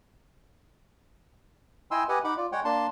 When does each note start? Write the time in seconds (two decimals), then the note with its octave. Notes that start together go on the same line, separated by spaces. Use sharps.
1.91 E4 D#5 G5 G#5 C6 E6
2.09 G4 B4 D#5 F#5 G#5
2.24 D#4 F#5 B5 D6
2.37 F4 D5
2.52 G#3 C#5 F#5 G5
2.65 A#3 D4 A5 C6